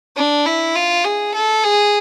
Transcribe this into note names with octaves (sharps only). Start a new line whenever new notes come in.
D4
E4
F4
G#4
A4
G#4